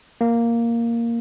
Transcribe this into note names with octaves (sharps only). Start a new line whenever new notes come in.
A#3